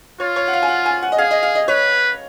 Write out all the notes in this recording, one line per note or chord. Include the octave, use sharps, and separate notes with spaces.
F4 C#5
C#5
F#5
F5
G#5
F#5
G#5
F#5
D#5
G#4 F5
D#5
F5
D#5
B4 C#5